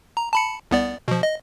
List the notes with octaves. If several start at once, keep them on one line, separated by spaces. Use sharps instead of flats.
A#5
A5 B5 C#7
C2 B3 D5
B2 F3
D#5